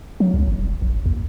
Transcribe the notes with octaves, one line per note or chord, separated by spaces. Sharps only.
F#3
C#2
G#1
E1
A#1
D#2